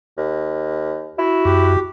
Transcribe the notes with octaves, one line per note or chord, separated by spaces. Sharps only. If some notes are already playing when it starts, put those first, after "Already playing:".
D#2
E4 F#4
F#2 G4